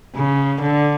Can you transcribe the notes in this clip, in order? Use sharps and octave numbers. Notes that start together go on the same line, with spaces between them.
C#3
D3